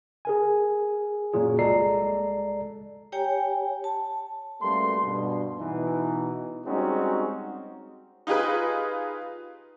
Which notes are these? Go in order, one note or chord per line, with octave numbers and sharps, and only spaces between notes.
G#4 A#4 G#5
F#2 A#2 F#3 F4 G#4
C2 G#3 A4 D5 A#5 C7
G4 C#5 G5 G#5 A#5
A5
F#2 G3 A3 A#3 B4 C6
G2 B2
B2 E3 D#4
G3 G#3 C4 C#4 D#4 F#4
D#4 F4 G4 G#4 B4